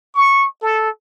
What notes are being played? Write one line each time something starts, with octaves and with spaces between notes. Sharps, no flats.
C#6
A4